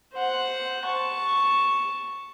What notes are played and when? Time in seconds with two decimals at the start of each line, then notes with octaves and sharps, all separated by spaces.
0.13 C5 F#5
0.86 A5 C#6